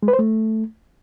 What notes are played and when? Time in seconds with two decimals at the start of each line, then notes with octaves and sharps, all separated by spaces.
0.03 G#3
0.08 B4
0.13 C5
0.19 A3